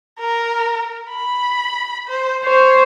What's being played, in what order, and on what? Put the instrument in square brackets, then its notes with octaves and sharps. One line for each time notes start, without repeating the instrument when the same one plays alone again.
[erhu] A#4
B5
C5
[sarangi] C5 [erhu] C#5